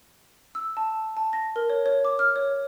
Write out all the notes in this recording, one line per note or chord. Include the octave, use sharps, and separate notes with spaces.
E6
A5
A5
A#6
A#4
C#5
C#5
D6
F6
C#5